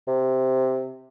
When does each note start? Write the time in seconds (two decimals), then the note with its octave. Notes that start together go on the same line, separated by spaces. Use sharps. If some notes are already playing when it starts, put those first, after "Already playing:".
0.08 C3